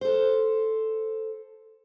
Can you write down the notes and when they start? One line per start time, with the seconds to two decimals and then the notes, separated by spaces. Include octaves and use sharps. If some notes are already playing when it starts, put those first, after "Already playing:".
0.01 A4 C5